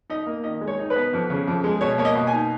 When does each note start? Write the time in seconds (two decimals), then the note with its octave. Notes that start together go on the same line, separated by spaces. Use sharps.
0.10 D#4 D#5
0.26 A#3
0.44 D#3 D#5
0.61 G#3
0.68 C#5
0.79 D#4
0.90 B4
0.96 B3
1.13 F2
1.30 C#3
1.47 F2
1.64 G#3
1.81 B2 C#5
1.98 A#3 C#5
2.05 D#5
2.15 B2
2.27 G#5
2.33 D#4